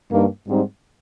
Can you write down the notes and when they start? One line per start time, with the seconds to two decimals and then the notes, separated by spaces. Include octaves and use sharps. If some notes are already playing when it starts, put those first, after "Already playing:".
0.10 G2 D#3 A#3
0.47 G#2 G3 C4 D#4